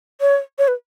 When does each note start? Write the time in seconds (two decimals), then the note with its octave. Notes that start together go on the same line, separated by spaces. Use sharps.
0.21 C#5
0.59 C#5
0.68 B4